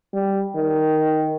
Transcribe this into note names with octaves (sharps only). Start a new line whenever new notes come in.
G3
D#3